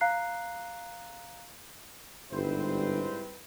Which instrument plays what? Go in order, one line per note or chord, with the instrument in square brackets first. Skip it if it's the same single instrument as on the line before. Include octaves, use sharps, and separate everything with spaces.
[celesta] F5 A#5 F#6 C7
[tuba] G1 [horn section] G#2 E4 C5 [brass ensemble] G3 C4 B4